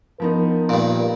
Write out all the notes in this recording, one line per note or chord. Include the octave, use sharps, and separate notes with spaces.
F3 B3 D#4 A#4
G2 A#2